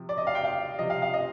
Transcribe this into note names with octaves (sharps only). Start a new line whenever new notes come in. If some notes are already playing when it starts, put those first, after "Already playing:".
Already playing: C3 F3
D5
D#5
F5
G5
F5
C3 F3 D#5
F5
F5
D#5